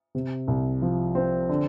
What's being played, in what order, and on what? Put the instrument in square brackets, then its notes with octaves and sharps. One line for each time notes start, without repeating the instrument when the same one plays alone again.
[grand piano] C3
C2
F3
C4
D3